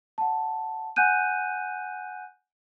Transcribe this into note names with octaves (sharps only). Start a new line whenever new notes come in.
F#5 A5
F#5 G#5 F#6 G6 D#7